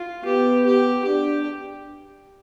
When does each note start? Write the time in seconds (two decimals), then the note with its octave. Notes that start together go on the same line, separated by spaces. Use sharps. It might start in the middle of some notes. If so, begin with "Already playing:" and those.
Already playing: F4
0.25 B3 G4
0.66 G4
1.05 D4 G4